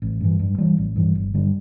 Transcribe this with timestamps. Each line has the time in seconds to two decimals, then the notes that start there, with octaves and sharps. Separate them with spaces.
0.02 A1
0.21 G2 E3
0.39 G2
0.58 E3 G3
0.78 A1
0.96 G2 E3
1.15 G1
1.34 G2 D3 G3